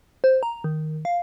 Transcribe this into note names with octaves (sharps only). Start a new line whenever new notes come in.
C5
A#5
D#3
F5